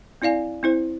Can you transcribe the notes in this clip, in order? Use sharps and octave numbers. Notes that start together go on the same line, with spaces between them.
C4 E4 D5 F5 G#5
C4 E4 C5